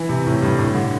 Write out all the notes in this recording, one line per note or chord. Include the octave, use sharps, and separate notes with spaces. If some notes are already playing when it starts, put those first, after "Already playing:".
Already playing: E3
C3
A2
G2
A2
D3